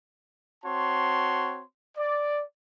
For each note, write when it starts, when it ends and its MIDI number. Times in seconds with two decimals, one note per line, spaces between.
0.64 1.62 60
0.64 1.62 66
0.64 1.62 73
0.64 1.62 81
0.64 1.62 84
1.97 2.42 74